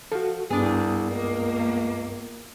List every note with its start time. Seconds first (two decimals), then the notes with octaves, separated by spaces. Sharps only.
0.12 F3 F#4 A4
0.50 C2 G2 B3 D4 G#4 D#6
1.10 C#2 A#3